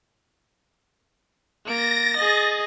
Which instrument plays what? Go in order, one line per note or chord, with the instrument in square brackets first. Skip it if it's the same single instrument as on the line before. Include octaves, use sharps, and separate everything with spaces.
[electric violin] A#3 D7 [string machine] A6 A#6
[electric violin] G#4 D#5